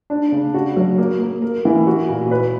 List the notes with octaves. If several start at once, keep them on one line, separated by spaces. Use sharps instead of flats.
D4
C#3
F#4
F#3
A#3
A#3
A#4
E3
F#4
A#2
B4